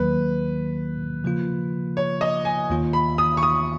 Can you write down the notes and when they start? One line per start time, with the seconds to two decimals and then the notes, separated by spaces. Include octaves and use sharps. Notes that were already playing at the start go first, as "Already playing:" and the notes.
Already playing: D#2 D#3 F#3 A#3 B4
1.24 C#3 F3 A#3 F4
1.97 C#5
2.21 D#5
2.45 G#5
2.70 D#2 D#3 A#3 F4
2.93 B5
3.18 D#6
3.37 C#6
3.43 D#6